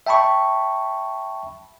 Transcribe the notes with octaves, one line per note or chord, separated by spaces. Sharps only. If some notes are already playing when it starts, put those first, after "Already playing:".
E5 G5 A5 B5 C#6